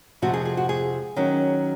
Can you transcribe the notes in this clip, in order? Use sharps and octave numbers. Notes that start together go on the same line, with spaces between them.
F2 C3 F3 G#3 C4 F#4
G#4
G#4
F#4
G#4
D#3 F#3 C#4